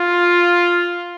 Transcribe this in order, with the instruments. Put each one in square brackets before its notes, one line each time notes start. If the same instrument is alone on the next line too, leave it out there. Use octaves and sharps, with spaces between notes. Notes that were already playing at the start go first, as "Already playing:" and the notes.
Already playing: [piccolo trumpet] F4